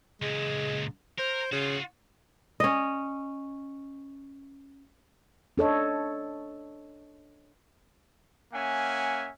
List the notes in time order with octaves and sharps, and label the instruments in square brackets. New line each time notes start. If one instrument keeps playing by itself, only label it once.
[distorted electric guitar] C#2 A#2 [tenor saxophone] G#3
[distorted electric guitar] A#4 [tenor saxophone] C5
[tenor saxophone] C#3 [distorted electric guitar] F4 F#4
[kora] C#4 D#5
[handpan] D4 A4 C#5 D#5
[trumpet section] A#3 C#4 E5 F#5 G#5